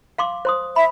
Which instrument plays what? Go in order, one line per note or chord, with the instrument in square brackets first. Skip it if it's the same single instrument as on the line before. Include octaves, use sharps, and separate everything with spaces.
[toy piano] F5 C6 D6
C5 C6 D#6
[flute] E5 [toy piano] B5